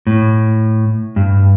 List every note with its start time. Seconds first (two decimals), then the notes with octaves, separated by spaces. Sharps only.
0.07 A2
1.16 G2